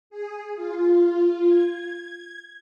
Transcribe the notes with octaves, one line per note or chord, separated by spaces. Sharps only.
G#4
F4
G#6